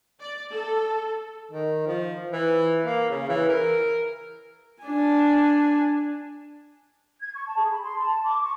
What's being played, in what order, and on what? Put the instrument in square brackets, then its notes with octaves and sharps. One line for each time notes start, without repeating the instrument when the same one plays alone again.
[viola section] D5
A4
[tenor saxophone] D#3
F3
E3
A#3
C#3
E3
A#4
[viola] D4 G#5
[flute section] G#6
C#6
A5
G#4
B5
C6
A5
D6
C#6